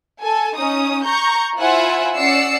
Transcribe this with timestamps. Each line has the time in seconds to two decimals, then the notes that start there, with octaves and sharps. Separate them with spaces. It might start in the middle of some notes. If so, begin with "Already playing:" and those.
0.21 A4 G#5
0.57 C#4 D#4 D#6
1.03 A#5 C#6 G6
1.58 E4 F4 C5 E5 F#5 G#5
2.17 C#4 D5 F#5 E6 C7 C#7